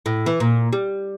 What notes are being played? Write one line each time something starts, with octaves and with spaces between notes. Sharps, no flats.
A2
E3
A#2
G3